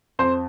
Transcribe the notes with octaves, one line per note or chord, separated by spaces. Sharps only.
F2 C5